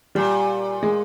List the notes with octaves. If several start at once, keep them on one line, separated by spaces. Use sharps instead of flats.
A#2 G3
G#3